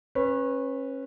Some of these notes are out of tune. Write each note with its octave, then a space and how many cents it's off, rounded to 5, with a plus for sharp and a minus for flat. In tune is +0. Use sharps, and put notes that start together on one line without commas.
C#4 -30 B4 -5